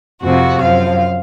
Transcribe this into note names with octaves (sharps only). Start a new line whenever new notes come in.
F2 C3 F3 F#4
F#2 F3 F5